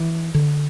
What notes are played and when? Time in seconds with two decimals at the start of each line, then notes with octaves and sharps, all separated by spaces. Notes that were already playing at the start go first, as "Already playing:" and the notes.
Already playing: E3
0.34 D3